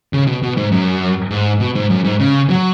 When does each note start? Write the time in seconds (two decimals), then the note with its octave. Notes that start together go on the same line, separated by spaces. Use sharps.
0.13 C#3
0.27 B2
0.43 B2
0.57 G#2
0.72 F#2
1.31 G#2
1.60 B2
1.75 G#2
1.90 F#2
2.04 G#2
2.19 C#3
2.50 F#3